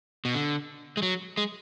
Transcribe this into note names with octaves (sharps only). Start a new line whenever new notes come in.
B2
D3
G#3
F#3
G#3